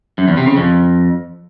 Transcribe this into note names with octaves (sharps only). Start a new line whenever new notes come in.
F#2
E2
C3
C#3
F2